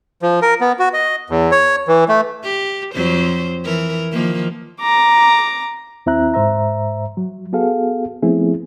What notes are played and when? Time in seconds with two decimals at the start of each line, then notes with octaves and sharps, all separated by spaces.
0.22 F3
0.42 A#4
0.61 B3
0.79 F#4
0.93 D#5
1.30 E2
1.52 C#5
1.88 E3
2.09 A3
2.44 G4
2.94 F2 F#3 C5
3.65 E3 A#4
4.12 D#3 F3 A#3
4.81 A#5 D6
6.06 D#2 C4 E4 E5 A#5 F#6
6.34 G#2 C5 E5 A#5
7.17 F#3
7.53 B3 F#4 G#4 A4 F5
8.22 F3 A3 B3 C4 E4 G#4